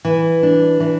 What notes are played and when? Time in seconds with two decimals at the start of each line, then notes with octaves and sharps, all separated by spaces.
0.05 E3
0.43 D4
0.80 E3